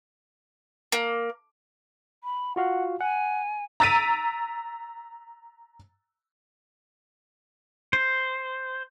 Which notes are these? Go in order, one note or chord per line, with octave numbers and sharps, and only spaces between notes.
A#3
B5
F4 F#4 F5 F#5
F#5 G#5
A#5 E6 A6 B6 D7 D#7
C5